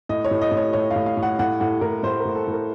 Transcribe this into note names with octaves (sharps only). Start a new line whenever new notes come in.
A2 D#5
C#5
A2
D#5
A2
C#5
A2 C#5
F5
A2
F5
A2
F#5
A2 F#5
A2 F#5
A2 A#4
A2 C5
A#4
A2
A4
A2 A#4